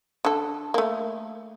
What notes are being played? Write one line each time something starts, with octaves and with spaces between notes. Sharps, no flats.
D3 A4
A3 A#3